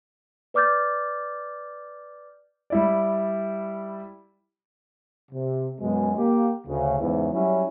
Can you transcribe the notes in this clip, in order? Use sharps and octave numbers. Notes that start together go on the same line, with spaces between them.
B4 D5 D6 F6 G6 A6
G3 E4 D5
C3
F#2 B2 G#3
A#3 G4
D2 C#3
E2 G#2 C#3 E3
F#3 G3 C#4 E4